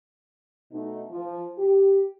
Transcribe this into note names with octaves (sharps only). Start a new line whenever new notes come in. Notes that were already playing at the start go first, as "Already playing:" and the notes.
B2 A3 D#4
F3
G4